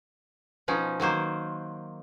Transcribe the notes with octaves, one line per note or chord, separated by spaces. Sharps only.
B2 F3 C#4 D#4
D#3 F#3 A#3 C5